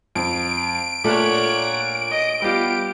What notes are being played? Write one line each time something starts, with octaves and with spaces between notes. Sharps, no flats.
F2 D7
A#2 A3 D4 C#5 F#5
D#5
G3 B3 F4 G4